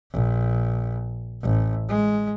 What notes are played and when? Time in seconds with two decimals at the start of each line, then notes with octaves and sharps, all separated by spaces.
0.12 A#1
1.42 A1
1.89 G#3